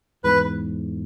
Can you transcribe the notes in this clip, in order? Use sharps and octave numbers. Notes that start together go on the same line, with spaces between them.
E2 G#2 B4